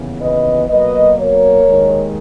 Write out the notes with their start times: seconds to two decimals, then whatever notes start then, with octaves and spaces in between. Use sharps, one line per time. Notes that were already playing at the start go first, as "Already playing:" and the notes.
Already playing: D#2 C#3 E3 B3
0.20 B4 D#5
0.69 B2 F#3 A#3 B4 D#5
1.17 A#4 C#5
1.65 D#2 D#3 G#3